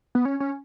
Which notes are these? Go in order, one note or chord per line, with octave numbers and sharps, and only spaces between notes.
B3
C#4
C#4